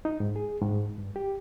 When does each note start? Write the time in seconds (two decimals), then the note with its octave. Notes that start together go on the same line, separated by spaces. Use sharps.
0.05 D#4
0.20 G#2
0.36 G#4
0.62 G#2
0.98 G2
1.16 G4